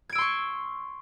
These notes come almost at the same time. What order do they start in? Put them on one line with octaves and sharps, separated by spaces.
G#6 D7 E6 C6 C#6